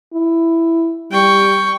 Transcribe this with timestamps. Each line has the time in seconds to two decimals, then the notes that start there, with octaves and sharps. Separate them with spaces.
0.14 E4
1.12 G3 G5 C#6